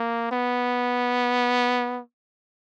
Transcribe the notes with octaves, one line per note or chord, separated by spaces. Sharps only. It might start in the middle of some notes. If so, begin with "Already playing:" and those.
Already playing: A#3
B3